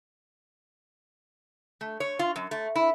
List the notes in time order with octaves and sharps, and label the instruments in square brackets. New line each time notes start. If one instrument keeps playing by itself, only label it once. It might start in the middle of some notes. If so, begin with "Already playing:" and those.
[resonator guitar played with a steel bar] A3
C#5
F4
F#2
A3
E4